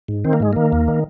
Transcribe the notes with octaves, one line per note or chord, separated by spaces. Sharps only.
G#2
D#3 C4
A#3
G#2 G#3
D#3 A#3
D#2
D#3